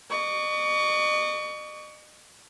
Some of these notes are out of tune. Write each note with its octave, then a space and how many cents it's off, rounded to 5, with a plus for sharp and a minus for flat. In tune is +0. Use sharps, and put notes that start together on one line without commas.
D#5 -40 C#6 +25